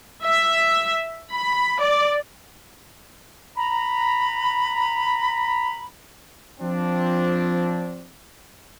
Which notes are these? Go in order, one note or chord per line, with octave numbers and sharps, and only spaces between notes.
E5
B5
D5
A#5 B5
F3 C4 D4